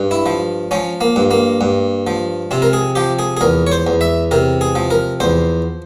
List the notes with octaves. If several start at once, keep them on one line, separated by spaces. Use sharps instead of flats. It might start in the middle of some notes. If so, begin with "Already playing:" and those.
Already playing: G2
E4
F3
F3 C#4
A#3
G2
A#3
G2
F3
C3 C4
A#4
G#4
F3 G4
G#4
G#4
E2 A#4
C#5
C5
E2
E5
C3 A#4
G#4
F3
A#4
E2 C5